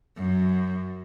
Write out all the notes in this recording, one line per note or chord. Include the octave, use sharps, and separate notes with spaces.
F#2 F#3